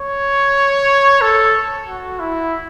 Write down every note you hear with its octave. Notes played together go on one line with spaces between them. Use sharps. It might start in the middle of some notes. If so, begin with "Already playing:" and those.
Already playing: C#5
A4
F#4
E4